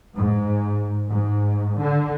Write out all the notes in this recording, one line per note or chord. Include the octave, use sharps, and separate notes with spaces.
G#2
G#2
D3